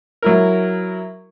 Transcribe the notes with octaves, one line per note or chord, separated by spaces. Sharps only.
F#3 E4 A#4